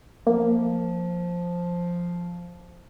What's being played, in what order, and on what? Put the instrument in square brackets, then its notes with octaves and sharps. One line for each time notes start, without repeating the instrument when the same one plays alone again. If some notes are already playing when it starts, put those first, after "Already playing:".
[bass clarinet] F3 [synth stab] A#3